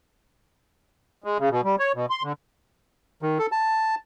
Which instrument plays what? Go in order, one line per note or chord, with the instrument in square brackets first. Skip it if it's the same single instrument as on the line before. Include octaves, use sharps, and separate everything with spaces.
[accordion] G#3
C#3
B2
G3
C#5
B2
C6
D3
[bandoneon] D#3
A4
A5